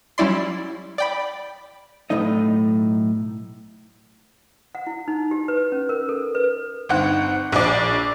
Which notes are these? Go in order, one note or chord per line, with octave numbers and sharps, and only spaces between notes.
F#3 G3 C#4 E4 D5 C6
D5 G5 B5
B1 A2 A3 D#4 D#5
F#5
E4
D#4
G4
B4
C#4
A#4
A4
B4
G1 C4 D#4 F#5
A#1 D5